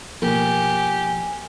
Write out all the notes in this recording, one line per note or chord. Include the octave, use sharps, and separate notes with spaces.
B2 F3 A#3 G4 G#5